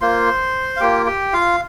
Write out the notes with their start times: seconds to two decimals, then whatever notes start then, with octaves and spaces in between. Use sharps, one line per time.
0.01 A#3 F4 C5 C6
0.76 F5
0.80 A#3 F4 G4 G5
1.06 G4 G5
1.33 F4 F5